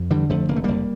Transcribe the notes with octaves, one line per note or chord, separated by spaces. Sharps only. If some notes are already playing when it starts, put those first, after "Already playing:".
Already playing: F2
D3 E3 G3
F2 F3 A3
F1 A#3
A3
F1 G3 A#3